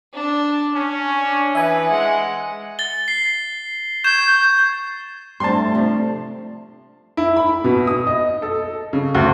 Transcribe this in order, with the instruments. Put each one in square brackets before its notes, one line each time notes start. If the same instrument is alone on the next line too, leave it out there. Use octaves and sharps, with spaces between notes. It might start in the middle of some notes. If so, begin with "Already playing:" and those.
[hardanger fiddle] D4
[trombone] C#4
[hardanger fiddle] D4
[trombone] E3 [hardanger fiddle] B4 [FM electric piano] E5 G#5 D#6
[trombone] G#3 [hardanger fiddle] F#5
[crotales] A6 G7
C7
[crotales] C#6 G#6 E7 [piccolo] G6
[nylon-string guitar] G3 C4 D4 [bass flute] A3 [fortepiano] A5 C6
[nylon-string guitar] C3 F3 D4
[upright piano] E4
B5
B2
D#6
D#5
A4
C#3
D2